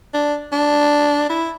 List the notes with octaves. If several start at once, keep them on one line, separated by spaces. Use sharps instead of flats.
D4
D4
E4